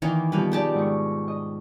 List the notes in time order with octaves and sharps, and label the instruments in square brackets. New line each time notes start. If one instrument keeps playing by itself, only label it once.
[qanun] D#3 E3 A#3 [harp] D#5
[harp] B2 F3 G3 [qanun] A#3 B4
[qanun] D#4 G4 A5 [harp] G#4 D5
[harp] G#2 D#3 C#6
D#5